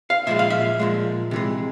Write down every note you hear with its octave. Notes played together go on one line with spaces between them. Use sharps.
F5
A#2 F3 G#3 E5
F5
E5
A#2 F3 G#3
C3 E3 G#3